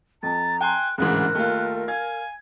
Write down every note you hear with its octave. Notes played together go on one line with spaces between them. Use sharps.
F2 A#5 A6
G5 G#5 C6 F#6
D1 D2 G#2 C#3 E3 A#4 F#6
D#2 A3 F4
F5 G#5 G#6